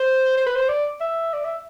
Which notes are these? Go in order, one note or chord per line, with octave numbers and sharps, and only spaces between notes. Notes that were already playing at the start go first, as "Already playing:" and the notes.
Already playing: C5
C5
B4
C5
D5
E5
D5
E5